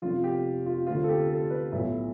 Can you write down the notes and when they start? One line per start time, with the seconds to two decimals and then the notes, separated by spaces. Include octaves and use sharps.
0.02 F1 F2 C3 F3 F4
0.24 G4
0.66 F4
0.87 D2 D3 A3 C4 F4
1.04 A4
1.09 G4
1.29 A4
1.50 B4
1.72 B1 A2 F3 E4